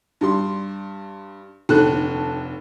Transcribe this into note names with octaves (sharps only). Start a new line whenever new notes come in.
G2 G3 C6
F1 D#2 D3 A4 A5 F#6